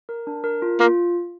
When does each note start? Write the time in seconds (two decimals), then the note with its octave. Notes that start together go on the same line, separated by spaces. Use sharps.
0.09 A#4
0.27 D4
0.44 A#4
0.62 F4
0.80 A#3 F4